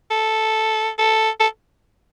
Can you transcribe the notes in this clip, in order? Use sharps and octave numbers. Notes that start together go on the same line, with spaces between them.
A4
A4
A4